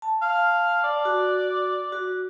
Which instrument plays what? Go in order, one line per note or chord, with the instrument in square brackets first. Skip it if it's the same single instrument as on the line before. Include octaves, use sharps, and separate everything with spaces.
[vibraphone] A5
[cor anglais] F5
D5
[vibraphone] F#4
F#4